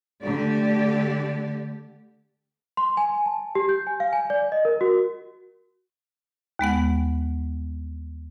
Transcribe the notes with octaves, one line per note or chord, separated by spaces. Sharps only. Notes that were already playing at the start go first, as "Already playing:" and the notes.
D3 A3 G4 D5
C6
G#5
A5
G4
G6
G#5
F5
G#5
D5
D#5
A#4
F#4
D#2 G#3 B3 F#5